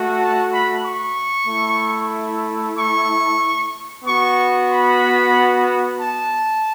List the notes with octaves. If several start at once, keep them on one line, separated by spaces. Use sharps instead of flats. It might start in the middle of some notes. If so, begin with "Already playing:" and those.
Already playing: A3 F#4
A5
B5
C#6
A3 E4
C#6
B3 F#4 C#6
B5
A5